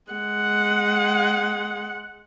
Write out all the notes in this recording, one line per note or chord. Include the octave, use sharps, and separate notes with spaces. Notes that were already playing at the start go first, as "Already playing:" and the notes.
G#3 F#5